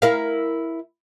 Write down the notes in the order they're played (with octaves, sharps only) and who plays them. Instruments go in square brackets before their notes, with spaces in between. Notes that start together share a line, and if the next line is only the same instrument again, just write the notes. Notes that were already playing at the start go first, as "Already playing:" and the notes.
[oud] E4 A#4 F5